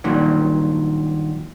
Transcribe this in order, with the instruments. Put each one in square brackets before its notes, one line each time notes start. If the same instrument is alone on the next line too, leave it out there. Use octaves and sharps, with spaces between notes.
[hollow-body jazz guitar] G2 A#2 D#3 F#3